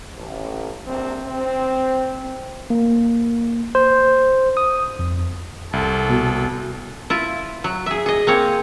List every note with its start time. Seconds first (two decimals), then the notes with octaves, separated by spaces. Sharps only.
0.18 A1
0.88 A#1 C3 C4
1.27 C4
2.70 A#3
3.75 C5
4.57 D#6
4.99 F2
5.73 C2 A4
6.09 B2
7.10 E4 F4
7.64 F#3
7.86 G#4 E5
8.06 G#4 D#5
8.27 A#3 C4 C#5